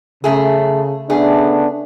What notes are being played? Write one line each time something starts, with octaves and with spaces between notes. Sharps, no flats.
F#2 C#3 A3 G#4
C#3 A3 B3 D4 G#4